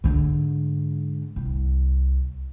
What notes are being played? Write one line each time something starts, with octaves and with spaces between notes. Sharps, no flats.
G#2 D3
C2